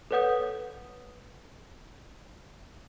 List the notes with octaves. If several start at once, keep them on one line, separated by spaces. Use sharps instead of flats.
A4 B4 C#5 F#5 D#6 G6